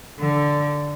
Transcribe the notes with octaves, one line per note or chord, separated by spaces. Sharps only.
D3